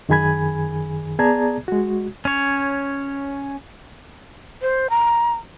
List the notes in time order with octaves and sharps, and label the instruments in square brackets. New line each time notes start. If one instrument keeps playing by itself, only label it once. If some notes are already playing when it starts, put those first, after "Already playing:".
[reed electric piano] F#2 D#3 G#4 G#5 B5 G#6
B3 G#4 D5 A5 A#5 G#6
G#3 F#4
[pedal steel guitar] C#4 C#5
[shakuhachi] C5
A#5